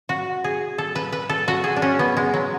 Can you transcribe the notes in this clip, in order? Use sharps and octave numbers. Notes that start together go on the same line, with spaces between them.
F#4
G#4
A4
B4
B4
A4
F#4
G#4
D4
C#4
B3
G#3
F#3